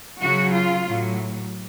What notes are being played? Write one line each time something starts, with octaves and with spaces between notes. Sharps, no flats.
C#3 F#3 F#4
F4
A2 F#3